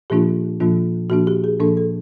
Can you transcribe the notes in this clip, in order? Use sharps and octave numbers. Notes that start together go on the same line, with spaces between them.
A#2 F3 A#3 D4 F4 G4
A#2 F3 A#3 D4 F4
A#2 F3 A#3 D4 F#4
G4
G#4
A#2 F3 A#3 D4 A4
A4